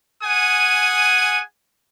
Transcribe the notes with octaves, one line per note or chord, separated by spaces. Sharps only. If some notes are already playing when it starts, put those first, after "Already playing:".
G#4 F#5 G#5 D#6